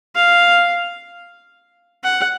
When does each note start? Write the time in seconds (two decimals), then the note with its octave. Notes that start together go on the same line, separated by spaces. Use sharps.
0.15 F5
2.04 F#5